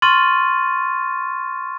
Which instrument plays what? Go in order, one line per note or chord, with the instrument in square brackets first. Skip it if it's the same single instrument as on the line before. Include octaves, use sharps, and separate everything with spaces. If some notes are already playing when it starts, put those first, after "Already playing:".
[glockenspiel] C6 C#6 F6 A6 D#7